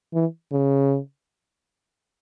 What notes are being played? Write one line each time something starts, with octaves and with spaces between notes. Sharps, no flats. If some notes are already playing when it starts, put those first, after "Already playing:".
E3
C#3